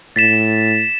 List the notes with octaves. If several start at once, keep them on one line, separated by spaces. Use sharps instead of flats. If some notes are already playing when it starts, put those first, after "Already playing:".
A2 A6 B6 E7